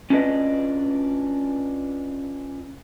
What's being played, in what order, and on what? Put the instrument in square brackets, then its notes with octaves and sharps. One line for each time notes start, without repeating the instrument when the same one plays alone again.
[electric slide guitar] C#4 D4 F4 A4 B4 D#5